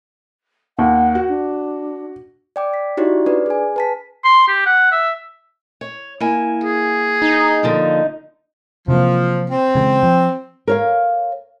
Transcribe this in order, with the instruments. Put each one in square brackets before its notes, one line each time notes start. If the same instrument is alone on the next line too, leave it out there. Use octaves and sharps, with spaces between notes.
[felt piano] D#2 [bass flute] F#5
[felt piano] F#4
[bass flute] D4
[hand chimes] D5 G5 D6
B6
D#4 E4 F#4 G4 C#5 D5
D4 B4 D5
G#4 G#5
B4 A5 B6
[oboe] C6
G4
F#5
E5
[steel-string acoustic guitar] C#5
A#3 E4 G#5
[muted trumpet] G#4
[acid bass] D#4
[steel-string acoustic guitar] D3 F3 A#3
[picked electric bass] C3 E3 A#3 [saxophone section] F3
[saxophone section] C4
[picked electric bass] C#3 E3 G#3
F3
[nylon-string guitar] A#4 C#5 F5